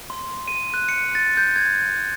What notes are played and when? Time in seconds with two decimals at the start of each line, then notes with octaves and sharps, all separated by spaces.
0.10 C6
0.48 D#7
0.74 F#6
0.89 C#7
1.15 A6
1.37 G6
1.56 G#6